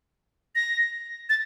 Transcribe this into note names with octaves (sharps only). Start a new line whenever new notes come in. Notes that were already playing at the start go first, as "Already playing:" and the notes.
A#6
A6